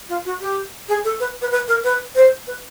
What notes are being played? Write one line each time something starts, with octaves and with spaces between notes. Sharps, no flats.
F4
F#4
G4
G#4
A4
B4
B4
B4
A#4
B4
C5
B4